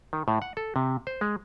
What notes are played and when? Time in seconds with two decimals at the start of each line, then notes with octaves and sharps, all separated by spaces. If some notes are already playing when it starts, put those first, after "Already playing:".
0.13 D#3
0.28 A2
0.42 F#5
0.57 A4
0.76 C3
1.07 C5
1.21 G#3